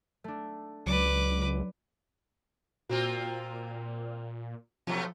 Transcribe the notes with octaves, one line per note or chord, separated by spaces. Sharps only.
A3 D4
C#2 F#3 B4 D5 D6
A#2 A#3 C4 F4 F#4
B2 F3 F#3 A3